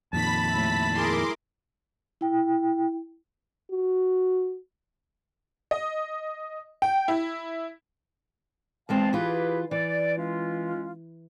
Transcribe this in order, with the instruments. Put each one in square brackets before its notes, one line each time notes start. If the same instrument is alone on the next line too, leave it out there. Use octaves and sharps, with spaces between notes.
[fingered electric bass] F2 A#2 D#3 [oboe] A5 [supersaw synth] B5 B6
[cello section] A2 E5
[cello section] E4 G#4 A#4 [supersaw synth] C6 D6
[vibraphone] E4 G5
[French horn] F#4
[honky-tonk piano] D#5
G5
E4
[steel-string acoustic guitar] E2 G#3 C4 [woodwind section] F5 A5
[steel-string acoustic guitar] E3 F4 [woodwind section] G4 G#4 B4
[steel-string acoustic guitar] E3 [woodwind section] D5
[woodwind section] G#3 C#4 F4